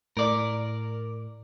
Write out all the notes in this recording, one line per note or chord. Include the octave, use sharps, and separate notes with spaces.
A2 A#4 D5